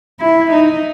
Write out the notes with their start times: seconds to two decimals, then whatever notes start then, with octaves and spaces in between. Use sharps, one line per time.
0.20 E4
0.51 D#4